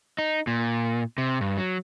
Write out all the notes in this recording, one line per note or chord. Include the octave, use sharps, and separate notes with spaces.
D#4
A#2
C3
G2
F#3